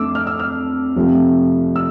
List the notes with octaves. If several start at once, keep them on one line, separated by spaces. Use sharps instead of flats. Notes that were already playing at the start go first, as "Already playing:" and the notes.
Already playing: F2 A3 D4 D6 E6
F6
E6
F6
F2 C3 F3 A3
E6